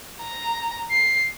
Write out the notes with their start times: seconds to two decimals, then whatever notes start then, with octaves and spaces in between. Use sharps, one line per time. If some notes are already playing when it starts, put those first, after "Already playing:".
0.21 A#5
0.91 C7